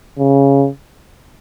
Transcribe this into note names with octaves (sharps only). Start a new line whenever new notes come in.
C#3